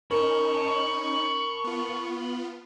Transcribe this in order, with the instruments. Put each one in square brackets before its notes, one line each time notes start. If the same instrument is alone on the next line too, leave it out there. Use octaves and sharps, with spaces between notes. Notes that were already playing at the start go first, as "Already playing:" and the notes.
[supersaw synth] C#4 D#4 [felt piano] A#4 [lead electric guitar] A5 B5 [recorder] C#6
[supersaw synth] B3 F4